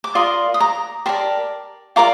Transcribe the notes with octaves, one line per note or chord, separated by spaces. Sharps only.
D6
F4 A#4 D5 C6 D#6
D#6
A#5 D6
G4 A#4 D5 A5 C6
F4 A#4 D5 A#5 D6